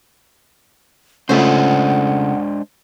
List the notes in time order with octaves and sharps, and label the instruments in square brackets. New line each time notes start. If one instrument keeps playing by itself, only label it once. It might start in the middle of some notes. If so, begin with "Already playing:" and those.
[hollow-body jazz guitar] C#3 A3 F4 [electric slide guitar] G#3 D4 C5 [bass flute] F#5